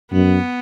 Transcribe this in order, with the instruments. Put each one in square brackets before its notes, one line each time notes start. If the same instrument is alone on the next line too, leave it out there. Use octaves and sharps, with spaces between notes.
[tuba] F#2 [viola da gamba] B3